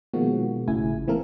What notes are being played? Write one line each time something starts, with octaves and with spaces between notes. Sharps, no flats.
B2 D#3 F3 G#3 A#3 F#4
G#1 A2 C#3 E4 G#5
E3 A3 A#3 C4 A4 A#4